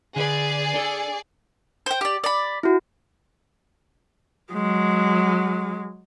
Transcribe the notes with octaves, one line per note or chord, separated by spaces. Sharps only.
D3 G#4 B4 D5
D4 A4
C5 G5
G4 D5
D5 B5
E4 F#4
F#3 G#3